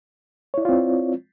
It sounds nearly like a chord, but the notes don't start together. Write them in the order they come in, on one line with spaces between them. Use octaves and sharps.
C#5 E4 D5 F4 C4